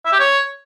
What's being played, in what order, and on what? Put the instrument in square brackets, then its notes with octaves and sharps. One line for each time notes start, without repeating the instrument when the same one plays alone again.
[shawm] E5
G4
C#5